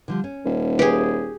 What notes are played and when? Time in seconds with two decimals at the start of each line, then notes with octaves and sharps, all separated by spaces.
0.08 D3 F3 G3
0.24 C#4
0.45 D#1
0.79 G4 G#4 B4